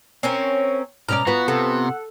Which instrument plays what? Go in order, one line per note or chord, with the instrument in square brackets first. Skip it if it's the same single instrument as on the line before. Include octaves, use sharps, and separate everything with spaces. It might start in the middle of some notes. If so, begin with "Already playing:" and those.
[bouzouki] C4 C#4 A#4 [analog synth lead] C#5
[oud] B2 C#4 D5 [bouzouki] A#5 [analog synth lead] F6
[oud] B3 F4 [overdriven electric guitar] F#4 [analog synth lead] B4
[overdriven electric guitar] C3 [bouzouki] A4 [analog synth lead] F#5